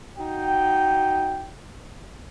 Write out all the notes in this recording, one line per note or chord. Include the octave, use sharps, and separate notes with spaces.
D#4 F#4 G5